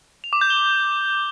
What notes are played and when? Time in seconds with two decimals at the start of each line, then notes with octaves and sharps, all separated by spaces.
0.24 F7
0.33 D6
0.41 G6
0.50 G7